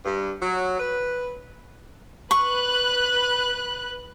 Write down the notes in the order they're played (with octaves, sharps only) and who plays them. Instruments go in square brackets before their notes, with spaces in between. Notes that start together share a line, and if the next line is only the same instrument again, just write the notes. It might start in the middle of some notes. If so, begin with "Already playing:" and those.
[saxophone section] G2
F#3
B4
[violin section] B4 F#6 [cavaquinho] C#6